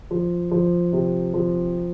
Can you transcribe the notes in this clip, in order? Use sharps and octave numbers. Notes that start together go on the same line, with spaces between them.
F3
F3
C3
F3